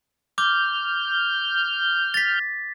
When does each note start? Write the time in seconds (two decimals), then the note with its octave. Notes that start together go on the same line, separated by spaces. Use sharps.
0.38 D6 F6 G6
2.14 A6 B6